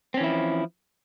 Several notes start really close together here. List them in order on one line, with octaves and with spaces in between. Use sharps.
C4 C#4 E3 E4 F3